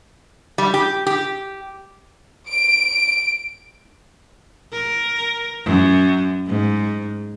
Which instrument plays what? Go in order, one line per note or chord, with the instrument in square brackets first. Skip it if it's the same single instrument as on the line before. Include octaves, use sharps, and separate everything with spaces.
[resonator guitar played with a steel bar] G3
G4
G4
[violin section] D7
[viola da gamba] A#4
F#2
G#2